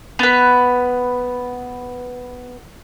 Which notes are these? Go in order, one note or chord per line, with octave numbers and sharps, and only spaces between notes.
B3 B4